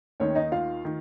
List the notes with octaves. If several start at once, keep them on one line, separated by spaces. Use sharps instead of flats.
D#2 D#3 C#4 C#5
D#4 D#5
F4 F5
D#3